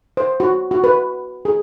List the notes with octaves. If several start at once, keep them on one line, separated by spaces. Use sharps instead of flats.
C5
F#4
F#4
B4
G#4